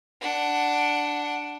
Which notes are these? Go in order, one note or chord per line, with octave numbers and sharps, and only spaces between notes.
D4 F#5